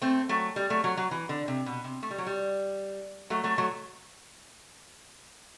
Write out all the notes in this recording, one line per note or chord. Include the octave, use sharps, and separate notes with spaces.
A3 C4
F#3 A3
G3
F#3 A3
F#3
F#3
E3
D3
C3
B2
C3
A3
G3
F#3
G3
F#3 A3
F#3 A3
F#3 A3